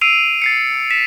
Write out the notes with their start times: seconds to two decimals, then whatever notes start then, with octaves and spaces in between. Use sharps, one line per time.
0.01 E6 C7 D7 D#7 F7
0.42 A6 C7 C#7
0.91 B6 E7